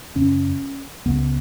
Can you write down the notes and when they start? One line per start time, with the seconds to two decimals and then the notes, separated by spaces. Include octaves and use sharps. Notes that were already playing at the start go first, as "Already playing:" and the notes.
0.15 F#2 C#3 C#4
1.05 C#2 C#3 B3